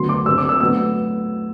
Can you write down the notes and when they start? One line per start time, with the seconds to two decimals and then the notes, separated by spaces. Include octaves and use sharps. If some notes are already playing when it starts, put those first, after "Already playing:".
Already playing: D2 D3 F#3 B3 C6
0.09 D6
0.26 G2 D3 G3 C4 E6
0.38 D6
0.49 E6
0.60 A2 F#3 B3 D4 E6